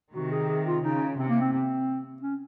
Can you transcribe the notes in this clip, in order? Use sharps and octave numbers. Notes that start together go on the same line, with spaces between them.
C3 D#3 F#4
G#4
G#4
F4
C#3 D#4
C3 C4
A#3
C4
C4
C#4